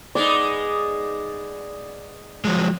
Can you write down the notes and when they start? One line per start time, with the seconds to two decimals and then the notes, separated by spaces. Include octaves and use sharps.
0.15 G#3 B3 D#4 D5
2.45 F3 F#3 G#3